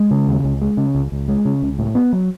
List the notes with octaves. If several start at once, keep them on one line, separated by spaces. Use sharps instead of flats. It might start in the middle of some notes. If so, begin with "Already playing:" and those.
Already playing: G#3
C#3
D#2
C#2
G#3
C#3
C#2
C#2
G#3
C#3
C#2
A2
B3
F#3